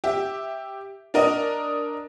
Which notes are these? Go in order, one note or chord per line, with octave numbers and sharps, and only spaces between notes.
G4 E5
D4 A#4 D#5